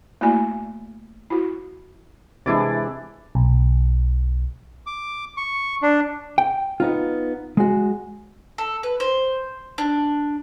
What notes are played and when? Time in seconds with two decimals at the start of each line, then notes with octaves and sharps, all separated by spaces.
0.21 A3 A#3 E4 F#4 D5 G#5
1.30 E4 F#4
2.46 C3 E3 G#3 D4 E4 D5
3.35 B1
4.86 D6
5.37 C#6
5.82 D4
6.38 G5
6.80 B3 D#4 F4
7.57 G#3 F#4
8.58 A4
8.83 B4
9.00 C5
9.78 D4